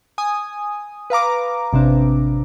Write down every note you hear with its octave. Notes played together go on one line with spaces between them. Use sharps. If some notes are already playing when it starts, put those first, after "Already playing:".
G#5 D#6
B4 F5 A#5 D6
A1 C3 C4 D4